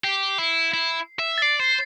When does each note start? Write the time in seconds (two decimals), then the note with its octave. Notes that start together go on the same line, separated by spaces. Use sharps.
0.04 G4 C7
0.38 E4
0.74 E4
1.19 E5
1.38 A6
1.42 D5 C7
1.59 C5